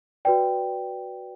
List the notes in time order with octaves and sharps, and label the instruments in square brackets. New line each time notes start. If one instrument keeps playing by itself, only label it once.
[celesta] F#4 B4 D5 G5